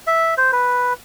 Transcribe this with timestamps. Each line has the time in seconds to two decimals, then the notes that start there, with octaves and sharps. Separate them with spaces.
0.07 E5
0.38 C5
0.52 B4